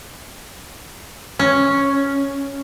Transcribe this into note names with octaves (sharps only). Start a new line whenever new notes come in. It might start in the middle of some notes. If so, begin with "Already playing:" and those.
C#4